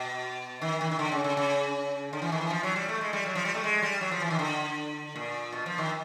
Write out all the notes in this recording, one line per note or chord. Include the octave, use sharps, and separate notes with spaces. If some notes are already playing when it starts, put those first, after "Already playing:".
Already playing: B2
D#3
D#3
D#3
D3
C#3
C#3
C#3
D3
E3
D#3
E3
F3
F#3
G3
A3
G#3
G3
F#3
F3
G3
A3
G#3
G3
F#3
F3
E3
D#3
D3
A#2
B2
F3
D#3